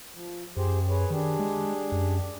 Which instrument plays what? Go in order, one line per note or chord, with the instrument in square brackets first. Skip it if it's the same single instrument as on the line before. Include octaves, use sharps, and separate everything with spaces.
[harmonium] F3
[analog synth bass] F#2 [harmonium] G4 G#4 C5
[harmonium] G#4 B4 C#5
[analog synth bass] D#3 [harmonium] D4 G4 G#4
[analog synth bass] G#3
F#2